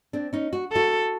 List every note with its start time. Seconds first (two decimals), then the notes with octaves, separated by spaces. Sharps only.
0.13 C4 D4
0.33 C#4 D#4
0.53 F#4
0.72 E4 F#4 A4